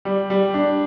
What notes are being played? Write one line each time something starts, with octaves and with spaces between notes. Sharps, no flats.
G3
G3
D4